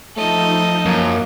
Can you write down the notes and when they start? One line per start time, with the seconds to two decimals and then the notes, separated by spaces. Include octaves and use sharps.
0.17 F3 A3 D#4 A4 D#5
0.85 F#2 A#3